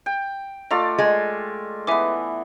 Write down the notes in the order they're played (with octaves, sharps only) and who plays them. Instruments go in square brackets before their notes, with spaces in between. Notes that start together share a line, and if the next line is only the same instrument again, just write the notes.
[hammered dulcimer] G5
[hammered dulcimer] A3 F4 D5 [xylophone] D#5 A#5
[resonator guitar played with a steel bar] G#3
[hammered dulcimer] E3 B3 [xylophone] E5 G#5 D6